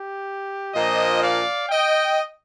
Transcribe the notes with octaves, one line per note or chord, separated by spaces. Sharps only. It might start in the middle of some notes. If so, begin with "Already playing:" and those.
Already playing: G4
A#2 F3 A#3 D4 C5 D#5
D5 F5
D#5 G5